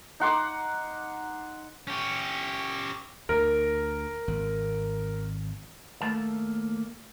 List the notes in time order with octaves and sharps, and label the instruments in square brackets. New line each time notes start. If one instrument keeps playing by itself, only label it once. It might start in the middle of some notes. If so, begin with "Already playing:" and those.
[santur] D#4 F#5 C6 D6
[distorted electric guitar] C#4 G4
[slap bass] D2 [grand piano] A#4
[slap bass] G#1
[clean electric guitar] D#2 A3 A#3 A5